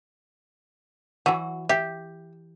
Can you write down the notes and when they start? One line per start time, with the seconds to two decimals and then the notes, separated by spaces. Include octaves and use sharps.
1.26 E3 F#3 F#4
1.69 G4 E5